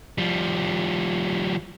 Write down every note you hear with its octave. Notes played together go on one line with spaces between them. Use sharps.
F3 G3